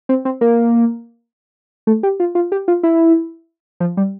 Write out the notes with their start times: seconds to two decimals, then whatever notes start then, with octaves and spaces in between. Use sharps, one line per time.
0.09 C4
0.25 C4
0.41 A#3
1.87 A3
2.03 G4
2.20 F4
2.35 F4
2.52 G4
2.68 F4
2.83 E4
3.80 F3
3.97 G3